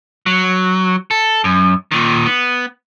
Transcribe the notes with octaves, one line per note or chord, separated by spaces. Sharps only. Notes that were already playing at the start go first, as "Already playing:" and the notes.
F#3
A4
F#2
A#2 D#3
B3